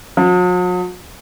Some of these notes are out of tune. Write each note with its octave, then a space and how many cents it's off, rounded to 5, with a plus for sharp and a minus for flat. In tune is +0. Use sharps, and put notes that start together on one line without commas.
F#3 -45